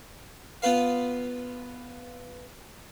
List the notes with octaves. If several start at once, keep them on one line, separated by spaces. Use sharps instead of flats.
B3 F4 B4 F5